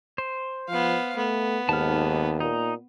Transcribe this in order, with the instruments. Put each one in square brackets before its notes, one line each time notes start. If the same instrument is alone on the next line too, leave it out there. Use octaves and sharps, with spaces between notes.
[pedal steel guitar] C5
[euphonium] F3 [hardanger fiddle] B3 F5
[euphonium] A3 [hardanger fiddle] B3
[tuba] D#2 [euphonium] G#2 [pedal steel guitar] A5 F6
[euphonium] A#2 [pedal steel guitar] D#4